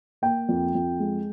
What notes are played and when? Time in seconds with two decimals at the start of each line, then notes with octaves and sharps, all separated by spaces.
0.22 A#3 G5
0.49 F2
0.75 F2
1.00 G#3